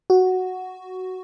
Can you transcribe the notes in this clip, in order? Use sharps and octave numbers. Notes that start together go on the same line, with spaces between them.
F#4